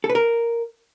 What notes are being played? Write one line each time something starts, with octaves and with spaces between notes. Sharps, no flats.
A4
B4
A#4